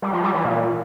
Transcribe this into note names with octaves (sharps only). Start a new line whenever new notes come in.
G3
F3
G3
E3
A#2